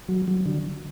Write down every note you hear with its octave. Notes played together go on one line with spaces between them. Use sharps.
F#3
F#3
D3